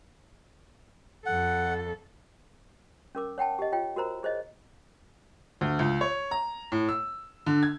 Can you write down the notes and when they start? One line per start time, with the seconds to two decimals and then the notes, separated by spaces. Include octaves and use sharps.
1.26 F2 A4 F#5
3.15 C#4 A#4 D6
3.38 C#5 F#5 G5 A5
3.59 G4 D#5
3.72 F4 C#5 G5
3.96 F#4 A#4 C5 A#5
4.23 G#4 C5 C#5 D#5
5.61 D2
5.79 C#2
6.01 C#5
6.31 A#5
6.72 A2
6.89 E6
7.46 D3
7.63 G#6